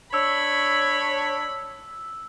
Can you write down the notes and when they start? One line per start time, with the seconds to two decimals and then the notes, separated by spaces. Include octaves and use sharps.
0.14 D4 C#5 B5 E6